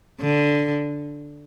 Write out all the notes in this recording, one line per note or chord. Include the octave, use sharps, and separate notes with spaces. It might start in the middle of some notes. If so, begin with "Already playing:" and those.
D3